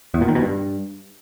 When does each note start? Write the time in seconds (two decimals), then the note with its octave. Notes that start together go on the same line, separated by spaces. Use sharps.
0.14 E2
0.21 A#2
0.28 D#3
0.35 B2
0.42 G2